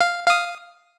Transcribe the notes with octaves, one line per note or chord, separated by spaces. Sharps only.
F5
F5 D#6